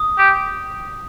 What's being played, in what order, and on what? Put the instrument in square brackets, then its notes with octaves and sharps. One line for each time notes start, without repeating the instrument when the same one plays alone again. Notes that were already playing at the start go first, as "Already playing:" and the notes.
Already playing: [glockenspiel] D#6
[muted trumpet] G4